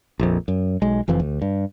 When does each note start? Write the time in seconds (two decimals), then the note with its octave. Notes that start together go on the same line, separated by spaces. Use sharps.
0.19 A#1 F2
0.48 F#2
0.82 B1 G#3
1.08 F1 F2 E3 F3
1.19 D2
1.42 G2